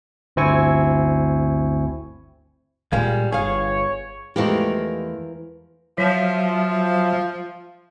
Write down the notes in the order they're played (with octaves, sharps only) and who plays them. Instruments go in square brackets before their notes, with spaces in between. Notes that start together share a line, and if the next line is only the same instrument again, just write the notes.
[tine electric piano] G1 D2 C4 E4 G#5 C#6
[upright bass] A#2 [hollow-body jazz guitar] G3 G#3 F5
[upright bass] G1 [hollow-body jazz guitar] G#4 F5 [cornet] C#5
[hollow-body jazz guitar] E2 A3 [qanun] E3 F3 A#4 [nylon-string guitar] G#3 G4
[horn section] F3 [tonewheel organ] F#3 E5